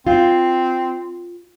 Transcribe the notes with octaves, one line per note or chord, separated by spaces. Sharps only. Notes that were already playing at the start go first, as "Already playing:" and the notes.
C4 F4